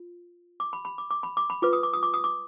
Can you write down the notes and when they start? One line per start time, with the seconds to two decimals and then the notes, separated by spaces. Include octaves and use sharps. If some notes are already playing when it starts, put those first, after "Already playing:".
Already playing: F4
0.60 D6
0.73 B5
0.85 B5
0.98 D6
1.11 D6
1.23 B5
1.37 D6
1.50 B5
1.62 F4 B4 D6
1.73 D#6
1.83 D6
1.93 D#6
2.03 D6
2.14 D#6
2.24 D6